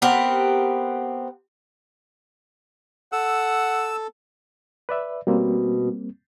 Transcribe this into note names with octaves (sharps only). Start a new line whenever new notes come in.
B3 C4 G4 A#4
A4 F#5 E6
B4 D5 E5
B2 G3 A#3 C4